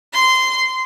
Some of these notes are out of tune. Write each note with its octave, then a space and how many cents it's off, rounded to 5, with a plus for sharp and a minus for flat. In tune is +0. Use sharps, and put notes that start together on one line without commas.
C6 -15